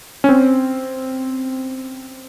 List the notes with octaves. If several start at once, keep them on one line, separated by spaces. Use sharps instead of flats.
C#4
C4